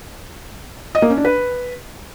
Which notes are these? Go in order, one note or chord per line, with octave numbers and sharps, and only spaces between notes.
D#5
A#3
C#4
D4
B4